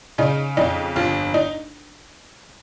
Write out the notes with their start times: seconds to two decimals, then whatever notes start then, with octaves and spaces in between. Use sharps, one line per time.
0.18 C#3 D#4
0.57 F2 D#4
0.96 G1 F4
1.34 D#4